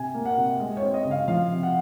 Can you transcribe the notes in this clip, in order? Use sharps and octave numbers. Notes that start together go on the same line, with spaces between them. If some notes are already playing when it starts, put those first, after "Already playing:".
Already playing: C3 G#5
A#3
F#5
C3
G#3
C#5
C4
D#5
C#3
F5
F3 F5
C3
F#5